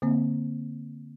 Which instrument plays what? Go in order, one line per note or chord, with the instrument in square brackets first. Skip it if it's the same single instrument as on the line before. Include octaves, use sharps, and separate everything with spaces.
[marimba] D3 A#3 C4